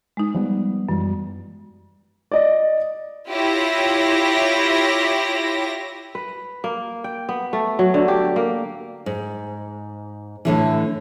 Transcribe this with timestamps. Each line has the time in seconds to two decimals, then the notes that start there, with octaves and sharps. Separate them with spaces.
0.17 G#3 D#4
0.34 F3 G3 B3
0.89 F#2 E3 G3 G#3
2.32 D5 D#5
3.29 E4 F4 G4 C#5 A#6
6.15 B4
6.64 A#3
7.04 G5
7.29 B3
7.53 A3
7.79 F#3
7.94 D3
8.08 G4
8.36 A#3
9.06 G#2
10.45 A2 D3 E3